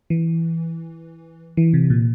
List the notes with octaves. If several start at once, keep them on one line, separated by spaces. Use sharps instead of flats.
E3
E3
C3
A#2